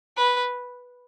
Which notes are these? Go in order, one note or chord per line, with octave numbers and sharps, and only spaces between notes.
B4